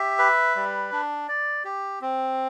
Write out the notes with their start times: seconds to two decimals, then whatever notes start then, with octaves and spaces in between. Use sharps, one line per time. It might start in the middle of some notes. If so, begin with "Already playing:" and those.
Already playing: G4 E5
0.19 B4
0.56 G3
0.92 D4
1.28 D5
1.64 G4
2.01 C4